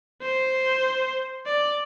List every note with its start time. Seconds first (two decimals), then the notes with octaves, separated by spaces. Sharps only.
0.22 C5
1.46 D5